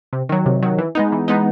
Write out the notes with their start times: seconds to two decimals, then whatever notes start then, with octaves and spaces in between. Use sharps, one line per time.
0.13 C3
0.29 D#3 F#3
0.46 C3
0.63 D#3 F#3
0.78 E3
0.95 G#3 B3 D#4
1.12 E3
1.28 G#3 B3 D#4